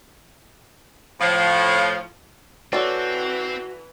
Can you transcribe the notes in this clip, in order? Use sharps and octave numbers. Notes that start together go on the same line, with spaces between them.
A2 F3
E3 C4 F#4 A4 C#5 D5